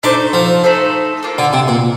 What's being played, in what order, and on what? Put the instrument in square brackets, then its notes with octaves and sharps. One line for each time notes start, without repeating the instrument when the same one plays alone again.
[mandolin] A3 D#4 A4 C5 [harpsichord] D4
[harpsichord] F3
[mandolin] A3 D#4 A4 C5
A#3 F4 A4
[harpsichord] D3
C3
A#2